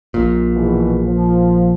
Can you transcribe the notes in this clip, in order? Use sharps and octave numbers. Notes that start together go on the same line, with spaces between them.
A#1 A#2
B2 E3 G#4
F3